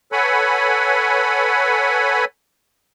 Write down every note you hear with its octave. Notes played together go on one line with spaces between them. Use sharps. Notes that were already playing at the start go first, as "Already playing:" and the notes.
A4 B4 C#5 F#5 G#5 B5